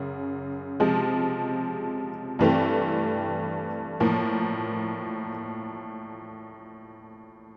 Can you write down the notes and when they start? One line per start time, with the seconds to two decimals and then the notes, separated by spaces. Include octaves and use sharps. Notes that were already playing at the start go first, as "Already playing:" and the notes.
Already playing: F#2 C#3
0.80 C3 F3 G#3
2.39 G2 E3 A3 C4
4.00 A2 F3 A#3